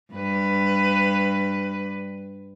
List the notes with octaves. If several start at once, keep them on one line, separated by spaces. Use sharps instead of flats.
G2 B4